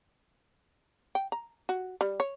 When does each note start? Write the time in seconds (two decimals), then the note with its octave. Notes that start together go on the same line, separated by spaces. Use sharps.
1.15 G5
1.32 A#5
1.69 F#4
2.01 G3
2.20 C#5